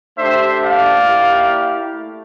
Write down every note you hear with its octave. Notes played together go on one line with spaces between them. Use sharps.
A3 D4 G4 C5 E5
D5 F5
A#3 E4 G4
A3